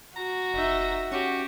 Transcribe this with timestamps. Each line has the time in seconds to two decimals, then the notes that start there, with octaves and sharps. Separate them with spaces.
0.16 F#4 A#5
0.54 F1 D#4 E5
1.12 C#4 F#4 G4